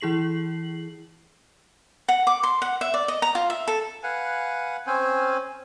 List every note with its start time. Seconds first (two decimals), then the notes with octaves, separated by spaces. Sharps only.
0.01 E3 E4 G#4 C7 F#7
2.09 F#5
2.27 D6
2.43 C6
2.62 F#5
2.81 E5
2.94 D5
3.08 D#5
3.22 A#5
3.35 F4
3.50 E5
3.68 A4
4.03 B4 F5 F#5 G#5
4.87 C4 C#4 C5 G#5